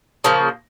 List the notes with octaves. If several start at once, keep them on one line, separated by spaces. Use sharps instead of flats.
C#3 F3 A#3